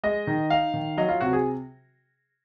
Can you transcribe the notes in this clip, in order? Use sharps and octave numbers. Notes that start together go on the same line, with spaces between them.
G#3 D#5
D#3
D#4 F5
D#3
F#3 D#5
F4
C3 F#4
G#4